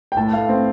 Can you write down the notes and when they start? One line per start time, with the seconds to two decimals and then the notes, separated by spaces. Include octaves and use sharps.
0.12 G5
0.16 A2 A5
0.33 A3 F5
0.49 C4